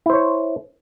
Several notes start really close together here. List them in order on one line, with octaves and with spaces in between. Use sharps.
E4 C5 C#5